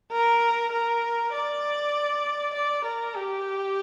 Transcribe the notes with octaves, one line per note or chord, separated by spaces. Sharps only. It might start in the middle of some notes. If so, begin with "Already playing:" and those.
A#4
A#4
D5
D5
A#4
G4